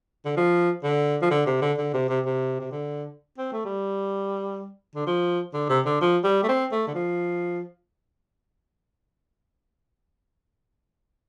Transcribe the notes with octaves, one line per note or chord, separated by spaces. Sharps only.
D3
F3
D3
F3
D3
C3
D3
D3
C3
C3
C3
C3
D3
C4
A3
G3
D3
F3
D3
C3
D3
F3
G3
A3
C4
A3
D3
F3